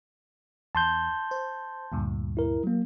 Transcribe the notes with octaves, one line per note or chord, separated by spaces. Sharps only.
E2 A5 C6 G6
C5
D2 G2 A#2
E4 A#4
F#3 A#3